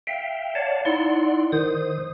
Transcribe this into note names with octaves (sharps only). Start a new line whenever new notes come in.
E5 F5 G5
C#5 D5 F5 F#5 A5
D#4 E4 D5 F#5 C6
D#3 C5 D#6